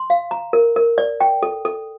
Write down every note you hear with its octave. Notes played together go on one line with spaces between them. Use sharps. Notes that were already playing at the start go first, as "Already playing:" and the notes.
Already playing: C6
F5
A#5
A#4
A#4
D5
G5
A4
A4